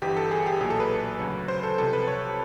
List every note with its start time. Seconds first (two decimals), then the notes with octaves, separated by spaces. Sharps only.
0.02 G1 G2 E3 G4
0.16 A4
0.31 G#4
0.46 G4
0.61 B1 A#2 F#3 G#4
0.70 A4
0.80 B4
1.19 D2 C#3 F#3
1.48 C5
1.63 A4
1.78 C2 C3 F3 A4
1.93 B4
2.07 C#5